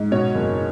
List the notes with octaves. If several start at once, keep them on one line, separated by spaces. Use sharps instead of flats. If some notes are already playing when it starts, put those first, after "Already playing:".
Already playing: G#2
B2 C#5
F#1